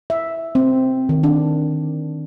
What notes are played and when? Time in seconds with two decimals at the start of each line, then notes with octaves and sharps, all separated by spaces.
0.10 E5
0.55 C4
1.09 D#3
1.23 D4